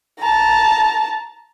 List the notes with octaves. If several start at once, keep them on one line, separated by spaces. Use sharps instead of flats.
A5 A#5